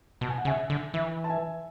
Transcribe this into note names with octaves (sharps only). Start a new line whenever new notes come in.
B2 A5
G#5
F#5
C#3 E5 G#5
E5
D3
E3 E5
A5
E5 G#5